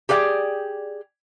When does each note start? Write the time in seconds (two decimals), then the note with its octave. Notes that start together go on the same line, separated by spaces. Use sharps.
0.09 G4 G#4 D5 F5 G5